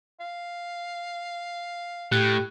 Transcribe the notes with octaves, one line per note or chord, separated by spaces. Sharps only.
F5
A2 G4 F#6